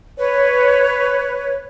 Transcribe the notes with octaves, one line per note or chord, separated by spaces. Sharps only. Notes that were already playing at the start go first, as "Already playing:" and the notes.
B4 C#5